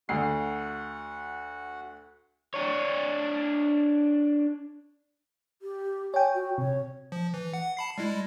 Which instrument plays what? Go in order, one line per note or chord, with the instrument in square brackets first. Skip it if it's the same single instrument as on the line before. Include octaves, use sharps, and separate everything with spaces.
[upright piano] D2 C7 [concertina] F#4 F#5
[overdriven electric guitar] D4 C#5
[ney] G4
[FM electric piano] C#5 G5 [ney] G#5
[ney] F#4
[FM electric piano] C3 [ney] C#5
[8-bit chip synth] F3
E3
F#5
A5 B5 C7
G3 G#3 E4